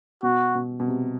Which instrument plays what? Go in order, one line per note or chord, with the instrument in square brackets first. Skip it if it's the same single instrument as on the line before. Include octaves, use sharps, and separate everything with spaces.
[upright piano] B2 [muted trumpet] F#4
[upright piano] B2
B2
C3